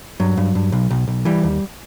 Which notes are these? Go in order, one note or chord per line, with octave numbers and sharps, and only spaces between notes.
G2 F#3
G2
G2
B1
B1
B1
E3 G3
D#2